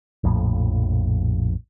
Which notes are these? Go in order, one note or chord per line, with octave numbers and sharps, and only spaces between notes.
A#1 F2 A2